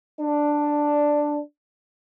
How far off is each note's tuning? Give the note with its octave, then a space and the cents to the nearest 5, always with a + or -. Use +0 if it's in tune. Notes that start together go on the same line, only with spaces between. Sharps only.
D4 +5